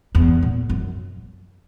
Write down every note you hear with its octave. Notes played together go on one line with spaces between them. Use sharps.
E2
A#2
F#2